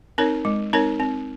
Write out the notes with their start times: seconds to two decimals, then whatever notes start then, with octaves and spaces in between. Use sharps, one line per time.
0.18 C4 D#4 A#4 C#5
0.45 G#3
0.73 C4 D#4 A#4 C#5
1.00 C4